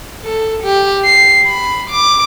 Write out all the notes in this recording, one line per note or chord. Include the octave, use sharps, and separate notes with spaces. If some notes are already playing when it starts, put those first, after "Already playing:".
A4
G4
C7
B5
D6